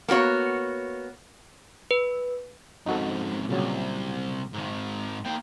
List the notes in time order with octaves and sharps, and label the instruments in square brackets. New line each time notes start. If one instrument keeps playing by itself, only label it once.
[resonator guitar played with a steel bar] A#3 B3 F#4 C#5
[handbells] B4
[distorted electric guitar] F2 G#2 [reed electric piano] D#4 F#4 A4
[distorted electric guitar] C2 [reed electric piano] A#2 C#3 F#3
[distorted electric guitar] G#2 D#3
A#3 G5